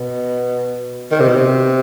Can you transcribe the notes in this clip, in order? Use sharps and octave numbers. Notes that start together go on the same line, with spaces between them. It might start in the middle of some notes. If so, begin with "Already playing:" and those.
Already playing: B2
D#3
C3
B2
C3